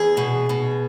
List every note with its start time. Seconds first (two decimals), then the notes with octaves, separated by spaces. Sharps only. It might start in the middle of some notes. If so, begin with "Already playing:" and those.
Already playing: E2 G#4
0.17 B2
0.49 B2